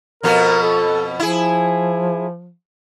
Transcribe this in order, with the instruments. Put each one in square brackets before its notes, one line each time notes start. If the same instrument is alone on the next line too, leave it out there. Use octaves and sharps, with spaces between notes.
[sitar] F2 B2 B3 [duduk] A#4
[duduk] A4
[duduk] F3 [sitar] E4 G#4